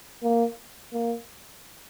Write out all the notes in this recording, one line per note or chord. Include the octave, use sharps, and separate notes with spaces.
A#3
A#3